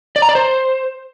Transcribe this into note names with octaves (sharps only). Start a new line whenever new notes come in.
D5
A#5
D5
C5